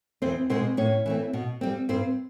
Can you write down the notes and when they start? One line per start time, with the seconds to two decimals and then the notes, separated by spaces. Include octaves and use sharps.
0.22 E2 C4 C5
0.50 B2 G#3 C4 C5
0.77 A2 C#4 C#5
1.06 E3 A3 C4
1.33 B2
1.61 G3 C4
1.89 G2 C4 C5